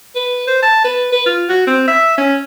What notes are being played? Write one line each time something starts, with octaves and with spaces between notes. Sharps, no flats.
B4
C5
A5
B4
B4
F4
F#4
C4
E5
C#4